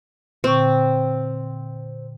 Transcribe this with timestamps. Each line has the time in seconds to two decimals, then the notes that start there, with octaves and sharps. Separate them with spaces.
0.44 A#2 D3 C4 C#6